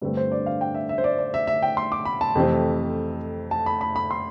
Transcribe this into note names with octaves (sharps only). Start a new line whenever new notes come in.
G2 D3 A3 C4 B4
C5
D5
F5
G5
E5
E5
C5
D5
D5
E5
E5
G5
C6
D6
B5
A5
F2 C3 E3 A3 C4
A5
B5
B5
B5
C6